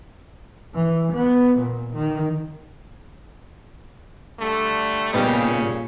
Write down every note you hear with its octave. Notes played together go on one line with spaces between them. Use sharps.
E3
B3
A#2
D#3
D3 G3 A3
A#2 C#3 G3 B3 D#4